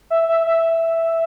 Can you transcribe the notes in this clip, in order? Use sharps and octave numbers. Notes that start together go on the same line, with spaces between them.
E5
E5
E5